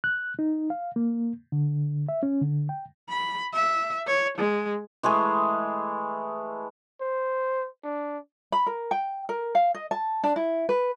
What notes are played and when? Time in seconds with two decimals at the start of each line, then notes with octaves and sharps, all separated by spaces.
0.04 F#6
0.39 D#4
0.70 F5
0.96 A#3
1.52 D3
2.09 E5
2.23 C#4
2.42 D3
2.69 G5
3.09 B5
3.53 E5
4.07 C#5
4.38 G#3
5.03 E3 G#3 A3 G#4
7.01 C5
7.84 D4
8.52 B5
8.66 A#4
8.91 G5
9.29 A#4
9.55 F5
9.74 D#5
9.91 A5
10.23 D4
10.36 E4
10.69 B4